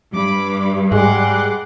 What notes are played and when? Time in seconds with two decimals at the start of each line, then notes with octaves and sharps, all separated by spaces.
0.14 G2 B5 D6
0.92 G#2 G3 G#3 G#4 F#5 C6 D6